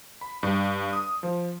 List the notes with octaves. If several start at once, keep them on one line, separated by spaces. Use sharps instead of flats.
B5
G2
D#6
F3